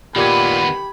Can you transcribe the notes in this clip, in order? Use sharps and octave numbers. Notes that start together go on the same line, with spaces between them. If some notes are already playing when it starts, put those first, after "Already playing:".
A#2 D#3 B3 G4 B5 G#6